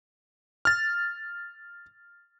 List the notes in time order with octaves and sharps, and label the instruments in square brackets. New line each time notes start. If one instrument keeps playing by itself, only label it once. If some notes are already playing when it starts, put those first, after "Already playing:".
[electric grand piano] F6 A6